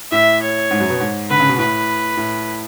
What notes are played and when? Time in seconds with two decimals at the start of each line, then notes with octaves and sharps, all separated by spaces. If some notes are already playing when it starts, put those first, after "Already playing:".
0.11 A2 E5
0.42 C#5
0.71 G#2
0.80 F#2
0.90 B2
1.00 G#2
1.29 D3 B4
1.40 C#3
1.49 B2
1.59 A2 B4
2.17 A2